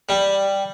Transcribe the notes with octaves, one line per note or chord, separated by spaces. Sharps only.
G3